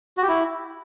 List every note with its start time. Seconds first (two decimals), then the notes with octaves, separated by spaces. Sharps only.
0.17 F#4
0.23 G4
0.28 E4